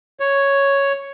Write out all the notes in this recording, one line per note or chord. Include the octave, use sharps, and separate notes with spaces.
C#5